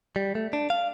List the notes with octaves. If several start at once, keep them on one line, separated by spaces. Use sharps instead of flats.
G3
A3
D4
F5